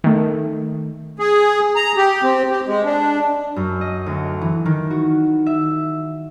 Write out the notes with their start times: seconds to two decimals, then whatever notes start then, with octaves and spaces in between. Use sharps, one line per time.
0.04 D#3 A3
1.19 G#4
1.76 A#5
1.97 G4
2.23 C4
2.50 G4
2.67 G#3
2.85 D4
3.56 F#2
3.81 D#5
4.06 D2
4.41 E3
4.65 D#3
4.91 F#4
5.46 E5